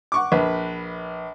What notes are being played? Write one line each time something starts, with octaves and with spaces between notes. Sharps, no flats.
F#5 C#6 D6
A#1 B4